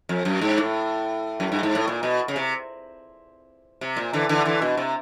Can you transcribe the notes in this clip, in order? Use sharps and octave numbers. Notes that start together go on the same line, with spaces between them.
F2
F#2
G#2
A2
F#2
G2
G#2
A2
A#2
B2
C#3
C3
C3
A#2
D3 E3
D3 E3
D3 E3
B2
C3